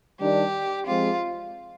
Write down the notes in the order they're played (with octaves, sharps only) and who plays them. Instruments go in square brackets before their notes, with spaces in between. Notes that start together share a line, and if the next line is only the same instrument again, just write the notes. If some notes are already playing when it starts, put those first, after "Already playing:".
[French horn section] D#3 G3 D4 [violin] G4
[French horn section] F3 G#3 C4 [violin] F4